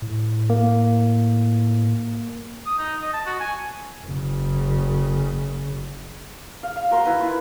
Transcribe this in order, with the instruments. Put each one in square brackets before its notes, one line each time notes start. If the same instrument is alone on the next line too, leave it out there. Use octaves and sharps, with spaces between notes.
[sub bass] A2
[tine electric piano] A#3
[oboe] D#6
D#4
D#5
A5
F#4
G#5
[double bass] F#1 C#3
[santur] F5
F5
F#4 A#4 C5 C6
E4 B4
E4 F4